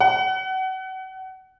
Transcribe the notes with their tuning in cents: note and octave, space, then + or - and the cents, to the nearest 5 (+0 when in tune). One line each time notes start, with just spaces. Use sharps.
F#5 +30